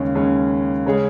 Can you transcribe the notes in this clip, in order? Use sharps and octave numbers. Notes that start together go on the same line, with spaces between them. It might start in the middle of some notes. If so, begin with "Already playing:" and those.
Already playing: D#2 C#3 G#3 C#4
D#2 C#3 G#3 C#4
C#3 G#3 C#4 G#4